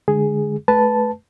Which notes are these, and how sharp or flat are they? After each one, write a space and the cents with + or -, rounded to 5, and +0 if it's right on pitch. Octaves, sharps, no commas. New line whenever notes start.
D3 +0 G#3 +0 G#4 +0
A3 -30 B4 +0 A5 -5